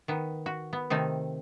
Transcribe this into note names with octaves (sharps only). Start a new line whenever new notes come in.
D#3 B3
F#4
B3
C3 D#3 A3 D#4